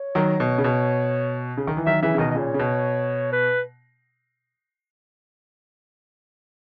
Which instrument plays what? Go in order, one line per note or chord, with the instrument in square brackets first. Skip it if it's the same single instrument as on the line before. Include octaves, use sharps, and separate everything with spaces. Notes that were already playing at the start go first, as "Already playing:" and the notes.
Already playing: [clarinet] C#5
[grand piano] D#3 F#3
B2
C#3
B2
C#3
D#3
E3
[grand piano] D#3 F#3 [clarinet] E5
[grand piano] C#3 E3 [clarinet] E5
[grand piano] C#3
[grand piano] B2 D#3 [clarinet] D#5
[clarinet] D#5
[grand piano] A#2 C#3 [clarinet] C#5
[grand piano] C#3
B2
[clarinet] B4